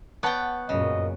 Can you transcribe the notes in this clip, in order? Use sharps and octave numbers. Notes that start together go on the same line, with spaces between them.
B3 C#5 F#5 G5 A5
F#2 A#2 C#3 D#5